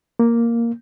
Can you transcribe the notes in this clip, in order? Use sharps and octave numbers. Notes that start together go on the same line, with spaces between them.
A#3